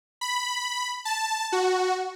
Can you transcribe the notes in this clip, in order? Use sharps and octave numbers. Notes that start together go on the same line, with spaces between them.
B5
A5
F#4